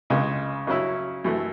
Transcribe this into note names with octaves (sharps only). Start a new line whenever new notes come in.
C#2 C#3 G#3
C#3 F#3 C#4 E4
F#2 E3 A3